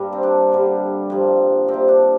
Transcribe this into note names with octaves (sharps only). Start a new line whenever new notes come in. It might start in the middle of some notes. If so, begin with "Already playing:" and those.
Already playing: G2 G3 A#3
C4
D4
G2 D3 G3
G2 F3 A#3
A#3 C4
C3
D4